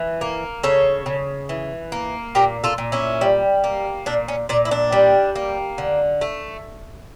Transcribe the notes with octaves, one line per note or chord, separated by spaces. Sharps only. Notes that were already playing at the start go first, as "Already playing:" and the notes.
Already playing: E3
A#3
C#3 A4 C#5
C#3
E3
A#3
A#2 G4 A#4
F4 A4
A#2
C#4 E4
G3
A#3
A#2 D4
C#4
A#2 D4
E4
D4
G3
A#3
D3
A3